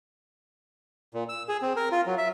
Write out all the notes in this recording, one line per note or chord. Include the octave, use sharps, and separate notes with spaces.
A#2
E6
G#4
C4
A#4
F4
F#3
E5